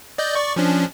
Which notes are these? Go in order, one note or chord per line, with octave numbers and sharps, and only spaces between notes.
D5 D#5 G6
D5 C#6
F3 C#4 D4